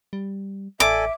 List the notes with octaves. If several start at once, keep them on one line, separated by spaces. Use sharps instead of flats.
G3
A1 A4 D5 E5 G#5 D6